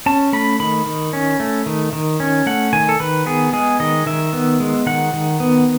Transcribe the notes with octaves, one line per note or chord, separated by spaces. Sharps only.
C#4 A5
A3 B5
D#3 B5
D#3
C#4
A3
D#3
D#3
C#4
A3 F#5
D#3 G#5
A4
D#3 B4
B3 G#4
G#3 G#4
D#3 D#5
D#3 E5
B3
G#3
D#3 F#5
D#3
B3